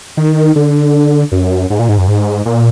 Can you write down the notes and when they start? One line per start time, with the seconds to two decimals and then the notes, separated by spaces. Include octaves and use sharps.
0.17 D#3
0.56 D3
1.32 F#2
1.70 G#2
1.79 A#2
1.89 G#2
1.98 F#2
2.08 G#2
2.46 A#2